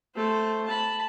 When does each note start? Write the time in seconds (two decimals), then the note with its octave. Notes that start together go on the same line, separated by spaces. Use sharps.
0.15 A3 C5
0.65 A5 B5